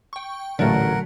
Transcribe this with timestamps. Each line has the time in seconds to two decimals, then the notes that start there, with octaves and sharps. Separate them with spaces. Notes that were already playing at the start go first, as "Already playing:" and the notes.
0.13 G5 C#6
0.59 A1 A#2 D3 F#3 A3 A#4 F#5